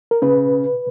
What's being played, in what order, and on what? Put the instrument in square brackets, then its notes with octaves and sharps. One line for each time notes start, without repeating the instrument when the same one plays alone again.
[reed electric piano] A#4
[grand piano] C#3 [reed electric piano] B4